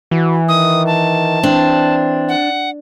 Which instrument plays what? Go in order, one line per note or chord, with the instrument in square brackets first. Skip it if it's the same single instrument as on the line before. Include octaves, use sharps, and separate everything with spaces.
[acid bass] E3 [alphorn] F#4
[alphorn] D#3 [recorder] D#6
[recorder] A5
[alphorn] C4 [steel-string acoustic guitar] D4
[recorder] F#5